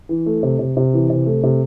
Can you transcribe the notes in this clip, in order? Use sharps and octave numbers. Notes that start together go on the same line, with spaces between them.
E3
A3
C3
C3
C3
E3
C3
A3
C3